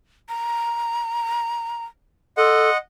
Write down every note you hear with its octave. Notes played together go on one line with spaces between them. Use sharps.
A#5
A4 D#5 F#5 C6